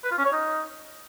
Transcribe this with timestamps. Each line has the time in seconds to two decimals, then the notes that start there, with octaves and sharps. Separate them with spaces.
0.04 B4
0.11 F4
0.18 C#4
0.25 C#5
0.32 D#4